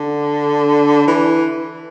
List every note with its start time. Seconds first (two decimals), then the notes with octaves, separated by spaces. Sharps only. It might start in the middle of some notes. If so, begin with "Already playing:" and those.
Already playing: D3
1.08 E3